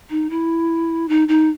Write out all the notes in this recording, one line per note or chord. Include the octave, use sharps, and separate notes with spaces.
D#4
E4
D#4
D#4